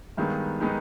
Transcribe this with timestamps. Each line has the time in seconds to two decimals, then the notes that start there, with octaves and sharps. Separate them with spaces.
0.17 G2 D#3 G#3 B3 D#4
0.60 D#3 G#3 B3 D#4